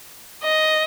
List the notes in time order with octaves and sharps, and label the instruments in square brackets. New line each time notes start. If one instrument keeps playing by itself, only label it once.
[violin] D#5